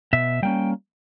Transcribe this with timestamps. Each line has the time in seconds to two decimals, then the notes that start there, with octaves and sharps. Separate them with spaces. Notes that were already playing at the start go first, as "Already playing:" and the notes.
0.13 B2 E5
0.43 G3 A#3 C#4 G5